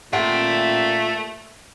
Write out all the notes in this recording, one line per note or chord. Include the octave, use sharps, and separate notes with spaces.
A#2 A3 G4 E5 F#5 G5 C6